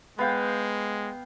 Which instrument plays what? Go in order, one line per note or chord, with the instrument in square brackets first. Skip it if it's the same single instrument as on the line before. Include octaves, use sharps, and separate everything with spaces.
[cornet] G#3 [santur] B3 F5 G5